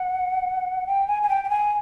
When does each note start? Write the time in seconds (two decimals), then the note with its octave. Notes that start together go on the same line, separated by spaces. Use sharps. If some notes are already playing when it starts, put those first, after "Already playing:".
Already playing: F#5
0.87 G5
1.08 G#5
1.23 G#5
1.29 G5
1.44 G5
1.50 G#5